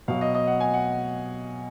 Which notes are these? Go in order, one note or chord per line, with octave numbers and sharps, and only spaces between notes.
B2 F#3 F5
D#5
D#5
F#5
G#5
F#5